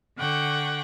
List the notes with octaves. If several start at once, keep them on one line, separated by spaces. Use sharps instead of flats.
D3 F#5 G5 C#6